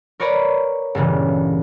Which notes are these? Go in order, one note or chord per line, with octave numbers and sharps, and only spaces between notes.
A#4 B4 C#5 D5 A#5 B5
G1 A#2 C#3 E3